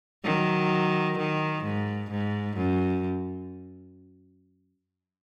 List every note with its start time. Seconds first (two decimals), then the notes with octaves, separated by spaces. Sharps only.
0.24 D#3 F#3
1.18 D#3
1.64 G#2
2.11 G#2
2.57 F#2